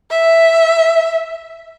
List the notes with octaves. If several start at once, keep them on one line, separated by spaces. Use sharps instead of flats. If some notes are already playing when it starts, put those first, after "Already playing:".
E5